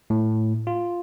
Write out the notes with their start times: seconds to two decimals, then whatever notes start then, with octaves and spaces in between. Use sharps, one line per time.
0.10 A2
0.67 F4